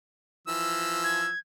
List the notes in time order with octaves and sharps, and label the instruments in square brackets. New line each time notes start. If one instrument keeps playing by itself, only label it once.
[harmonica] E3 F3 E6
[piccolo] G#6